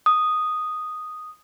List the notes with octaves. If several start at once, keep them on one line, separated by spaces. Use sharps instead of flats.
D#6